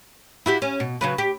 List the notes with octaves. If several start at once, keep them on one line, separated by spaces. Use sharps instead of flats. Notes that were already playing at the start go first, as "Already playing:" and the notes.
E4 F#4 G4
C#4
B2
C#3 F#3 B4
G4